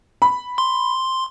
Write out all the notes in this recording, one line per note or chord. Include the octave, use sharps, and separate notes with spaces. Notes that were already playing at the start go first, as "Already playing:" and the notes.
B5
C6